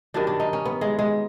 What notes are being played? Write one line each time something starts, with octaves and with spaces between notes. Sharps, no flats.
G2 D#3 F#3 D4
D4
D#4
C#4
B3
G#3
G#3